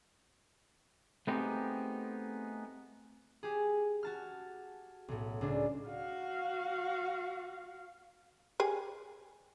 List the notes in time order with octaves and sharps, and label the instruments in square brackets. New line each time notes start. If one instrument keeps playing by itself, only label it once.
[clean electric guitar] A3 B3 C4 D#4 G4 G#4
[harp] G4 G#4
F#4 A5 F6
B1 A2
C#2 D4
[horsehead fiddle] F#4 F5
[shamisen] G4 G#4 G#5